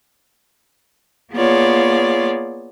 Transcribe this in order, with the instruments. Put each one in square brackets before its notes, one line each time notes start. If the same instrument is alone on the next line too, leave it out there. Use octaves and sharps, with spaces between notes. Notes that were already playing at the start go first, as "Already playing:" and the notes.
[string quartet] A#3 B3 F4 G#4 C#5 D5